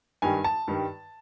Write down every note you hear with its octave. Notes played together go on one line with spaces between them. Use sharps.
G2 D#3 G3 G#5
A5
G2 D#3 G3